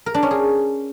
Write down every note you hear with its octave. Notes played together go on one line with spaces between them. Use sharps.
A#4
D4
C#4
G#4